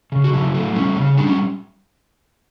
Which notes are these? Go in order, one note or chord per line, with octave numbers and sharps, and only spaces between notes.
C#3
F#4
F#3 E4
A3
G3 C#4
C#3
G3 D4
C#4